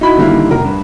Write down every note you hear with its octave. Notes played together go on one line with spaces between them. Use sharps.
D#4 E4 F#4 B5
D3 D#3 G3 A#3 E4
F1 A#4
G2